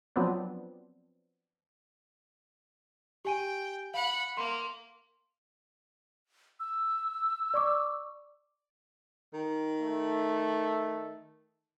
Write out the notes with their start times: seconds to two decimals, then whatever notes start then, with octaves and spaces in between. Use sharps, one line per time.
0.16 F3 F#3 B3 C4 D4
3.25 G4 G5 G#5 D#7
3.94 F5 F#5 B5
4.37 A#3 C6
6.60 E6
7.54 D5 C#6 D6
9.34 D#3
9.81 A3